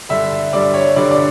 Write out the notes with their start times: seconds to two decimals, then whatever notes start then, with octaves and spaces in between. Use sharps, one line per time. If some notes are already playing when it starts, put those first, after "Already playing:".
0.09 G2 D3 G3 E5
0.53 G2 D3 G3 D5
0.74 C#5
0.96 G2 D3 G3 D5
1.11 D5